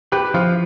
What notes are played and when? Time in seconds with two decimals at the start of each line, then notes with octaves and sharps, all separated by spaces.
0.12 G4 B4
0.34 F3 F4